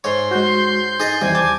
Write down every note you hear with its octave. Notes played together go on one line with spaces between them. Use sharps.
G#2 C#5 C6
G#3 F#4 G6
D#4 G#4 D#5 A6
D#2 C3 E3 G3 G#5
A5 D6